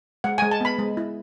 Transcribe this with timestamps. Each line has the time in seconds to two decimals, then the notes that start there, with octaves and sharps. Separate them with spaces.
0.24 G#3 F#5
0.38 G#5
0.42 G#3
0.51 A5
0.61 B3 B5
0.79 G#3
0.97 E4